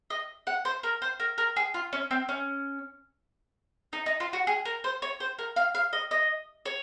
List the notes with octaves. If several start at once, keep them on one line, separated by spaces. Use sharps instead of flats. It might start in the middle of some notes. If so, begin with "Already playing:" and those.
D#5
F#5
C5
A#4
C5
A#4
A#4
G#4
F4
C#4
C4
C#4
D#4
D#4
F4
F#4
G#4
A#4
C5
C#5
C5
A#4
F5
F5
D#5
D#5
C#5